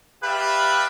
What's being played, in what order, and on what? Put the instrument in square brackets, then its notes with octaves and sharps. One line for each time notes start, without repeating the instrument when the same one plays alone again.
[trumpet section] G4 B4 D5 E5 F5